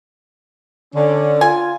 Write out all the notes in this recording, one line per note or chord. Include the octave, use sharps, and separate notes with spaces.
D3 C#4
F4 G#5